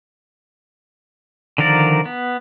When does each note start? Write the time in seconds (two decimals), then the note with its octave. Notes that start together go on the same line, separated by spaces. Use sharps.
1.58 D3 D#3 F3 A#4 D5
2.05 B3